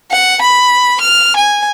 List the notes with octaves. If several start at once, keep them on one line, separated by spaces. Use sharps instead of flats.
F#5
B5
F6
G#5